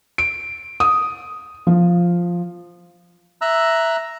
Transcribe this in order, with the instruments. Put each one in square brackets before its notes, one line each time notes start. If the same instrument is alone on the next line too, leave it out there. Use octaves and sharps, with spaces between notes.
[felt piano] D7
D#6
F3
[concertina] E5 A#5 E6 F#6